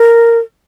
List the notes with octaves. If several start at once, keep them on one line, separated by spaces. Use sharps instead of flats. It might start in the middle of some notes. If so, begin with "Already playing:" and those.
Already playing: A#4